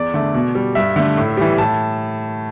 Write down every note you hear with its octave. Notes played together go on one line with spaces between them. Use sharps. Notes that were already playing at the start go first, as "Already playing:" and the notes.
Already playing: E2 D5
D3 A3
B2
G3
G2 E5
D3 A3
A2
E3 G3
A2 A5